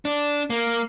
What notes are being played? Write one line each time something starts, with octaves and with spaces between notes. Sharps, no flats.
D4
A#3